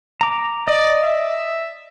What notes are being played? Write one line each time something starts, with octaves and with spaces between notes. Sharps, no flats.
A#5 D6
D5 D#5
E5